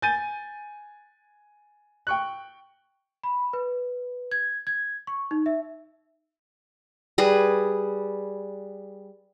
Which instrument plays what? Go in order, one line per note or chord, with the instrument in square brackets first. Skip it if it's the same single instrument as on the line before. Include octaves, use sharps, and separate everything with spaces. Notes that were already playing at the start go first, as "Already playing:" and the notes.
[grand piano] G#5 G6 A6 D#7
G5 C#6 F#6
[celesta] B5
B4
G#6
G#6
C#6
D#4
E5
[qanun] G3 G#4 B4